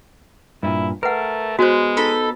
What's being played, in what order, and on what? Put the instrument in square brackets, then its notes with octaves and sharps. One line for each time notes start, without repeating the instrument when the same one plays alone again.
[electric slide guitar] G2 A#2 [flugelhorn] E4
[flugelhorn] A3 [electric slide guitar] A#4 [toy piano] B4 F#5
[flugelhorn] G#3 [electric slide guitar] B3 [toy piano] F#4 C5
[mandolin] D#4 A4 B5